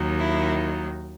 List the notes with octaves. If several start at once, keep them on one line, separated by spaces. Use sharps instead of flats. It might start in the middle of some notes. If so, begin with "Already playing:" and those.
Already playing: D#2 D#3 F#3
E4